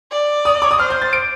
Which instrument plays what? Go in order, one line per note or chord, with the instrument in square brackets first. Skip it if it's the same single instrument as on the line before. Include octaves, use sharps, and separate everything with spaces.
[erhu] D5
[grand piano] D#6
D6
D#6
[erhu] C5 [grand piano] F6
[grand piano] G6
A6
D7